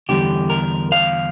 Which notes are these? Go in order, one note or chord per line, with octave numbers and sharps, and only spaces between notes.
E2 D3 G3 G4
A#4
F5